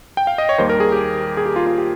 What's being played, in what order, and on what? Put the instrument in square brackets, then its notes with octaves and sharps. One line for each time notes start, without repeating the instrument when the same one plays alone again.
[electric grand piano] G5
F5
D#5
C#5
D#2 D#3 G3 A#3 C5
A#4
G#4
G4
G#4
G4
F4
F4
G4